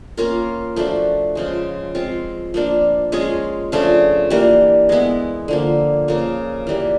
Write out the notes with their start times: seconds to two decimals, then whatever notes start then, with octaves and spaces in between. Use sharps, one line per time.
0.17 A#3 C#4 F4 A#4
0.76 F3 A3 D4 F#4
1.35 C#3 F3 G#3
1.95 G#3 C4 F4
2.54 F3 A#3 D4
3.12 G#3 C#4 F4 G#4
3.72 C#3 F3 A3 D4
4.30 E3 G3 A#3
4.89 G#3 B3 E4
5.48 D3 F3 A#3
6.08 C#3 F3 A#3
6.67 E3 G3 A#3